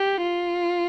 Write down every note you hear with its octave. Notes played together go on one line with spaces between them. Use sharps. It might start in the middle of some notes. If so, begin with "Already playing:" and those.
Already playing: G4
F4